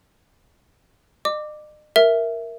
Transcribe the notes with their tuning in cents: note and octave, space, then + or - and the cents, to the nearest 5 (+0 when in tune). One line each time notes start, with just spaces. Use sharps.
D#5 -45 D6 +0
A#4 +0 E5 +0